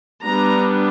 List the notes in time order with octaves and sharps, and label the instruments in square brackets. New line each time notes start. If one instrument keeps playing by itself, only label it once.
[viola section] G3 B3 D4 A#5